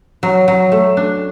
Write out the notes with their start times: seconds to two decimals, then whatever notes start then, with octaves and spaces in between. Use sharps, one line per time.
0.23 F#3
0.48 F#3
0.72 A3
0.97 D4